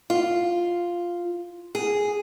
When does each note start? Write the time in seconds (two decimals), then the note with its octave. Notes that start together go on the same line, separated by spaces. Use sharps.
0.10 F4
1.75 G#4